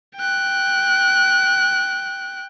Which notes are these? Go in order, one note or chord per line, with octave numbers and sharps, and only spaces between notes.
G5 F#6